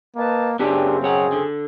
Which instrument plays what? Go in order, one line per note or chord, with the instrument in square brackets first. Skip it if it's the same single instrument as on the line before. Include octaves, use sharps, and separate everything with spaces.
[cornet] A#3 [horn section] B4 D#5 A5
[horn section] F#2 C#3 C4 [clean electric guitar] B3 G4 G#4 [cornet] D4
[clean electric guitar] B1 C#5 F#5 [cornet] G#4
[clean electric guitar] D3